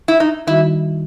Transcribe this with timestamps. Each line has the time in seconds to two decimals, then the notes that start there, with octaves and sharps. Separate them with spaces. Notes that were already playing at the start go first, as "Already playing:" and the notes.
0.08 E4
0.20 D#4
0.47 D#3 G3 D#4 E4 F#4